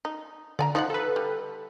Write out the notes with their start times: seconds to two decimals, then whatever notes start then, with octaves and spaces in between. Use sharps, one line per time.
0.05 D#4
0.59 D3 D5 G#5 A#5
0.75 F3 D#4 C#5 F#5
0.90 A4 B4
1.16 G3